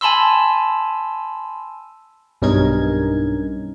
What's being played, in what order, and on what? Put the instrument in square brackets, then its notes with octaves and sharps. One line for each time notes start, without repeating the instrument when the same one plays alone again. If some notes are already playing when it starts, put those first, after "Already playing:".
[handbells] G#5 A5 B5 C6 E6
[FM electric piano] B1 G2 C#4 D#4 A#4 G#6